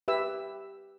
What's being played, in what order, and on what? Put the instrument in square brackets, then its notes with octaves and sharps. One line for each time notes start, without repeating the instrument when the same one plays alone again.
[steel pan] G4 B4 E5 E6